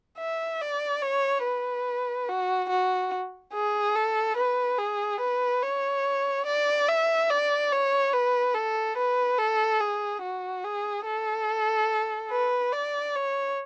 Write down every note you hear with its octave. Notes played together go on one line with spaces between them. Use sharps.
E5
D5
C#5
B4
F#4
F#4
G#4
A4
B4
G#4
B4
C#5
D5
E5
D5
C#5
B4
A4
B4
A4
G#4
F#4
G#4
A4
B4
D5
C#5